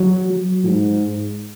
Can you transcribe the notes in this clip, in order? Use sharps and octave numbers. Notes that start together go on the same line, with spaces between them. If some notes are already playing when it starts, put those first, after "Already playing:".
Already playing: F#3
F#3
G#2